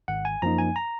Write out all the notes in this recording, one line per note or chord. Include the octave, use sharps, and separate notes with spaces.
G#1 F#5
G#5
F#2 F3 A#3 D#4 A#5
G#5
A#5